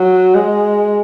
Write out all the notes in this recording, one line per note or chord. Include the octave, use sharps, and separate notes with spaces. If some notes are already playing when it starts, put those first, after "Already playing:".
Already playing: F#3
G#3